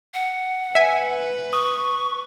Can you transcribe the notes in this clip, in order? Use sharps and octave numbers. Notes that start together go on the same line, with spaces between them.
F#5
B4 E5 G#5
C#6 D#6